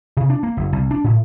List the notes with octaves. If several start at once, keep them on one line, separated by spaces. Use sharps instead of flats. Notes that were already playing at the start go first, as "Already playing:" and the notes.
C3
D4
A#3
F#1
C2
D4
A2